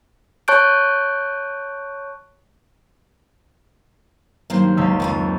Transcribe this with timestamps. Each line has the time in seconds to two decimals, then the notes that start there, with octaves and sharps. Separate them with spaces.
0.48 C#5 A5 C#6 F#6 G6 D7
4.50 G2 D#3 F#3 A#3 C5
4.77 F#1 C#2 E6
5.00 F2 D#3 G5 G#5